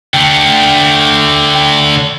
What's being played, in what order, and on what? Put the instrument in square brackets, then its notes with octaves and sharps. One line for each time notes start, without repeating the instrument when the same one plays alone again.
[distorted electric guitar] D3 A3 [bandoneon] G5